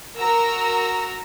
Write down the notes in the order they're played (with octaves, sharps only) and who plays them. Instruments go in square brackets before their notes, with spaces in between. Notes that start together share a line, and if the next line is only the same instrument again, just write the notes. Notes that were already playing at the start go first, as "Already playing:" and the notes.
[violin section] F#4 A#4 A#5 E6